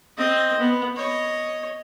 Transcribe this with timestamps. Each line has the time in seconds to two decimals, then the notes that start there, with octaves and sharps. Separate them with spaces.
0.18 C4 D#5
0.60 B3
0.96 C#5 D#5